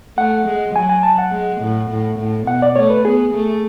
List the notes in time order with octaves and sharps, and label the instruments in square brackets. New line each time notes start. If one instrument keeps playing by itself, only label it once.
[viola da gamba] A3 [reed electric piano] F#5
[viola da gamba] G#3
[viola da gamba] F#3 [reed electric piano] G#5
[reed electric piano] G#5
A5
F#5
[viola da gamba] G#3
A2
A2
A2
[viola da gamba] B2 [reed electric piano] F#5
[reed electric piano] D5
[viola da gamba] A3 [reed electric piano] C#5
[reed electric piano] B4
[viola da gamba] B3 [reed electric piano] G#4
[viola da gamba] A3